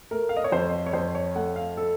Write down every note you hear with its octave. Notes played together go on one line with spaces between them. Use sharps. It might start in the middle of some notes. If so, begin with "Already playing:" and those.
A3 A#4
F5
D#5
C#5
F2 C5
C#5
F2 C5
C#5
A3 F#5
F5
A4